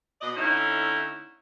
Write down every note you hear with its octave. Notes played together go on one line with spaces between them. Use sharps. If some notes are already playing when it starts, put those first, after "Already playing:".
B2 D5 D#5
D3 A3 C#4 D#4 E4